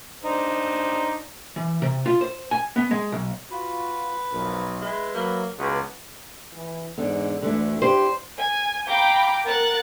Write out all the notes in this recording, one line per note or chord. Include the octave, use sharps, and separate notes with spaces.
D4 D#4 C5
E3
C3
F4
C5
G#5
B3
G#3
B1
F4 F#4 B4
B1 F3 A#4
G#3 E4 B4 E5
F#3 A#3
C#2 B3 F#4 G#4 B4
E3
E2 G#2 D3 D4
D2 D3 E3 A3
D4 E4 G4 C5
G#5
F5 G5 A#5 B5 D6 G6
A#4 F#5 F#6 A6